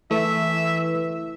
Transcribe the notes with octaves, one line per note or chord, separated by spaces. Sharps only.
E3 A3 E5